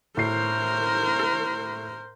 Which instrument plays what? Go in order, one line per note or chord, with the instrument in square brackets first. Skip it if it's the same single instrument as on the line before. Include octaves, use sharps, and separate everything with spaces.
[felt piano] A2 C7 [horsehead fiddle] A#4 C5